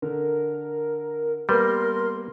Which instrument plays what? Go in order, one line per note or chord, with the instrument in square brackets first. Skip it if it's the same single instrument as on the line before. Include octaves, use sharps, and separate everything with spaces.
[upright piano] D3 [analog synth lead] A#4
[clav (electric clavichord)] G3 [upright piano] A#3 B3 B4 [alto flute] A#4 [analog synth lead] C6